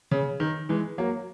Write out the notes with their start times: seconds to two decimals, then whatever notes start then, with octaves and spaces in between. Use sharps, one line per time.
0.11 C#3
0.40 D#3
0.69 E3 G#3
0.98 F#3 A#3